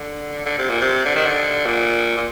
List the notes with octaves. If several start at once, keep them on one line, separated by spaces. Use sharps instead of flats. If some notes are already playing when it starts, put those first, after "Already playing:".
Already playing: D3
D3
C3
A#2
C3
D3
D#3
D3
A#2
A#2